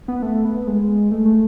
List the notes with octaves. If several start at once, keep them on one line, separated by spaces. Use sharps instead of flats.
B3
A3
B3
G#3
A3
A3